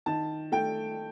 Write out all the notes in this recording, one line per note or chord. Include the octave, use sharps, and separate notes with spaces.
D#3 A5
A3 G5